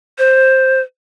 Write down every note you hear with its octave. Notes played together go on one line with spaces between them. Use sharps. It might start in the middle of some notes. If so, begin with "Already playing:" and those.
C5